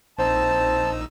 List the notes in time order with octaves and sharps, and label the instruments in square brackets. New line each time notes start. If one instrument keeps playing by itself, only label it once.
[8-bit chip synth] A#1 D#4 E6 [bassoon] C4 [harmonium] A5